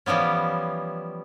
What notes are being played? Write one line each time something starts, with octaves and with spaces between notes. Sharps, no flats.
E3 F3 G3 B3 C#4